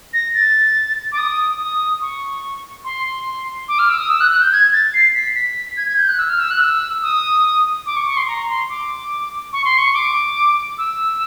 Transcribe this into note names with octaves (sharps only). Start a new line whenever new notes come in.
A#6
A6
D6
D#6
D#6
C#6
C6
D6
F6
E6
D#6
E6
F#6
F#6
G6
G#6
A6
C7
B6
B6
G#6
G#6
G6
F#6
E6
F6
E6
F#6
E6
D#6
D6
C#6
C#6
C6
A#5
C6
D6
C#6
C6
C#6
D6
E6